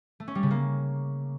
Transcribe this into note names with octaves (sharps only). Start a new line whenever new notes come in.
A3
C#4
G3
C#3
A#3